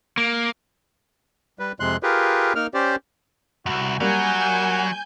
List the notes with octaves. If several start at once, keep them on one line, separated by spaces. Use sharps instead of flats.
A#3
G3 B4
F2 C3 G#3 C6 F#6
F4 G4 G#4 A#4 B4
A#3 D#4 A#4 F6
C#4 G4 C5 D5
C2 F#2 F#4
F#3 G3 A#3 F#5 G#5 G6